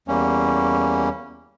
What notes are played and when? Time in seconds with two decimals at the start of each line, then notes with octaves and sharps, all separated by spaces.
0.08 E2 G3 A#3 C#4